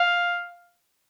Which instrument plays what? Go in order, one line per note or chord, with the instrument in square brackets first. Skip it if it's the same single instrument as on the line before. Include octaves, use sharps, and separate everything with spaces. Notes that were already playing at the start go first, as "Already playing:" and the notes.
Already playing: [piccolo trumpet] F5